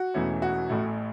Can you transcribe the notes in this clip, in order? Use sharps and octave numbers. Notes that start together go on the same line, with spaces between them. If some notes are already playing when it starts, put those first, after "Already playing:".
Already playing: F#4
E1 E2 E3 A3 C#4
F#4
A1 A2 A3